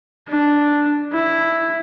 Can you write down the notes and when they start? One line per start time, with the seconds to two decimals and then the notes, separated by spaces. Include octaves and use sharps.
0.29 D4
1.13 E4